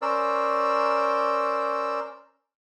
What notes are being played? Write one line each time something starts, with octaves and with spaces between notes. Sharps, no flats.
C#4 A#4 C5 D5 E6